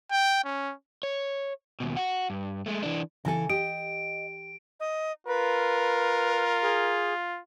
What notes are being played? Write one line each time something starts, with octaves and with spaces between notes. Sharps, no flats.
G5
C#4
C#5
D#2 B2
F#4 F#5
G2
G#3 A3
E3 D4
C#3 E3 E4 A4 G#5
G4 D#5 D7
D#5
F4 A#4 B4
G#4